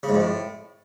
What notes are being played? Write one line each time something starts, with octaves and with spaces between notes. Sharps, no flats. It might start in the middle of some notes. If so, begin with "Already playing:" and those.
C#3
G#2
F2
A2